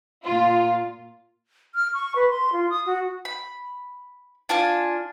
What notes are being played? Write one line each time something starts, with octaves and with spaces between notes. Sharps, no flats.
A#2 F4
F6
C#6
B4
C6
F4
D#6
F#4
B5
D4 F4 G#5 A5